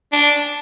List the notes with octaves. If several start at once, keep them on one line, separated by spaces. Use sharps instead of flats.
D4